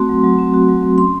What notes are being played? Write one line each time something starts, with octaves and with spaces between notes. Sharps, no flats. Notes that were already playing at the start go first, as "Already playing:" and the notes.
Already playing: A3 C4 F#4 C6
F#3
F#3
C4
F#4
F#3
F#3
C#4 C6